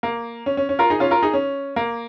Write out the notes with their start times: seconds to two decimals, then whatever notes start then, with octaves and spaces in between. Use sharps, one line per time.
0.03 A#3
0.46 C#4
0.57 C#4
0.69 C#4
0.79 F4 A#4
0.90 D#4 G#4
1.00 C#4 F4
1.11 F4 A#4
1.23 D#4 G#4
1.34 C#4
1.76 A#3